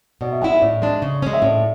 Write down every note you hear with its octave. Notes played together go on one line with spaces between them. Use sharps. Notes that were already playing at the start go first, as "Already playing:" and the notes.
B2 D5
E5
G#3 C#4 E4 F#5
E5
A2 D5
G#3 D4
C#3
G#3 C#4
E5
A2 D5